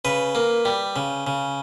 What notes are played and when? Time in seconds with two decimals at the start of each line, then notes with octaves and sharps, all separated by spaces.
0.05 C#3 B4
0.35 A#3
0.65 G3
0.96 C#3
1.27 C#3